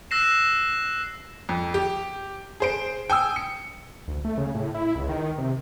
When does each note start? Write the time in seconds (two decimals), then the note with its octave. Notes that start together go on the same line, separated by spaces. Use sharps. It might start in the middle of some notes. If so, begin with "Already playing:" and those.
0.11 E6 F#6 A#6 C7 E7
1.49 F2
1.74 G4
2.60 G#4 C5 D7
3.10 G5 G#5 D#6 E6
3.36 C#7
4.08 D2
4.24 A3
4.38 C#3
4.55 A2
4.74 E4
4.95 C#2
5.09 D#3
5.38 C3